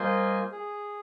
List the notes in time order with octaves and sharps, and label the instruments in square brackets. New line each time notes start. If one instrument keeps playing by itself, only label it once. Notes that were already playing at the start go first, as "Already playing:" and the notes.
Already playing: [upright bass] G3 [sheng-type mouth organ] A#3 F4 C5 D#5 G#5
[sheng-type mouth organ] G#4